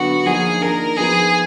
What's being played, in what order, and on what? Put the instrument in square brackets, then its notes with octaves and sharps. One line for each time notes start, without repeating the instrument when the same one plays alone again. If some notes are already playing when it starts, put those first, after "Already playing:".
Already playing: [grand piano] D3 F#3 B3 D4 [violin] F#4
[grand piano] F3 A#3 D#4 [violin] G#4
[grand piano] D#3 A#3 D4 [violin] A#4
[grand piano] F3 B3 D#4 [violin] G#4